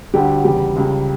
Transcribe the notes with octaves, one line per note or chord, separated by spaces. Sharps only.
D2 D3 G3 G4
E2 C#3 G3 G4
C#2 C#3 G3